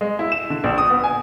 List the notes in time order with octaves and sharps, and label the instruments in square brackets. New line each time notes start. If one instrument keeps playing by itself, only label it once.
[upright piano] G#3
E4
E7
D3
A#1
D#6
B3
G#5